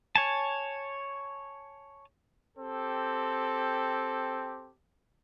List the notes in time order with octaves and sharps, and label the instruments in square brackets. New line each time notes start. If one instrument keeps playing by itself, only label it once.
[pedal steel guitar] C#5 G#5 A5
[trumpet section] C4 G4 A4